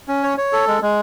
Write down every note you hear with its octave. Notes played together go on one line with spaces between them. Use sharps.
C#4
C#5
C#5
A4
G#3
G#3